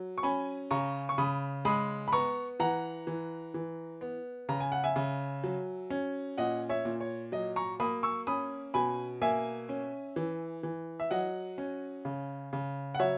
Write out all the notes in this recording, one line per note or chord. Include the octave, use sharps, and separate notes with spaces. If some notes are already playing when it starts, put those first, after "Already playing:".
Already playing: F#3
C#6
C#4 G#5 B5
C#3 A#5 C#6
C#6
C#3 B5 D#6
G#3 B5 D#6
B5
B3 A#5 C#6
E3 F#5 A#5
E3
E3
B3
C#3 A#5
G#5
F#5
E5 G#5
C#3
F#3
C#4
A#2 D#5 F#5
C#5 E5
A#2
C#5
F#3 D#5
A#5 C#6
A#3 B5 D#6
C#6 E6
C#4 B5 D#6
B2 G#5 B5
A#3 E5 G#5
C#4
E3
E3
E5
F#3 D#5 F#5
C#4
C#3
C#3
F#5
F#3 C#5 E5